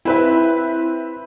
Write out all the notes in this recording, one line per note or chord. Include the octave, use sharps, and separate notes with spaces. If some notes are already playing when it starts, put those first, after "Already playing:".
C4 E4 B4 E5